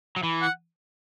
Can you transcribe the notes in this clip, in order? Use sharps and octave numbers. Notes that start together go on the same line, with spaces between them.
F#3
E3
F#5